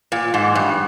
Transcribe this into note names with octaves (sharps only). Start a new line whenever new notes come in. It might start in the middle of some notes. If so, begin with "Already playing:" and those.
A#2
G#2
G2